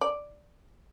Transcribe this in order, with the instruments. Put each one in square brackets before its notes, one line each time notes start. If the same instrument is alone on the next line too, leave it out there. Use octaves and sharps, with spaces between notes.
[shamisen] D5